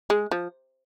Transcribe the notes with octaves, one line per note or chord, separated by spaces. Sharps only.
G#3
F3